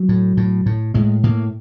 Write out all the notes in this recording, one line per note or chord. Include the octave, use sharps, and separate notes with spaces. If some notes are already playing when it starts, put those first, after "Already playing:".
Already playing: F#3
A2
A2
A2
A2 G#3
A2 A#3